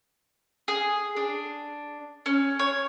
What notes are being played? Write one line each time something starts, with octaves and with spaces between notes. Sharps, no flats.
G#4
D4
C#4
C#5